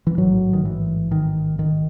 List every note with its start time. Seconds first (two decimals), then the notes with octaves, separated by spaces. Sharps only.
0.07 E3
0.18 A1 G#2 F#3
0.53 D#3
0.65 E3
1.12 D#3
1.59 D#3